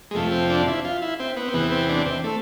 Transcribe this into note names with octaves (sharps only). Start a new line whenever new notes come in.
G#3
F2 C3 F3 A3
C4
D4
E4
F4
E4
C4
B3
C4
E2 C3 E3 B3
C4
D4
C4
A3